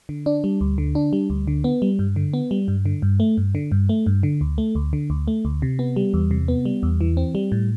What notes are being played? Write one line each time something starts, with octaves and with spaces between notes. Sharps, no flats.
D3
D4
G3
D2
D3
D4
G3
D2
D3
B3
G3
G2
D3
B3
G3
G2
D3
G2
A3
G2
D3
G2
A3
G2
D3
D2
A3
D2
D3
D2
A3
D2
C3
B3
G3
E2
C3
B3
G3
E2
E3
C4
G3
A2